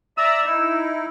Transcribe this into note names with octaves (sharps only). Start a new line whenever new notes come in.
D5 E5 A#5 E6
D#4 E4